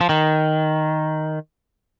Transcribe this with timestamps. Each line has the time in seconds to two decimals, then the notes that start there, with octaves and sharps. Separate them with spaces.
0.01 F3
0.09 D#3